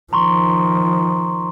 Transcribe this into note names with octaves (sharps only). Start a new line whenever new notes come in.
D#3 F3 A#5 C6 C#6